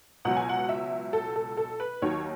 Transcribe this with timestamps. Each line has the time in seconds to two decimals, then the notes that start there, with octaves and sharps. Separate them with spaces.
0.25 C#2 B2 F#3 F#5
0.37 G#5
0.49 F#5
0.69 E5
1.13 A4
1.36 A4
1.57 A4
1.80 B4
2.02 D#2 D#3 F#3 C#5